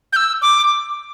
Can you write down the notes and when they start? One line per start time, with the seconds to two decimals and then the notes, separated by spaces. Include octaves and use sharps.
0.13 G6
0.16 E6
0.42 D6